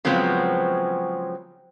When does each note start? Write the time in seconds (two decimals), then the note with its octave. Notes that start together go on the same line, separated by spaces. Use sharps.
0.05 C#3 F3 F#3 G#3 B3 C4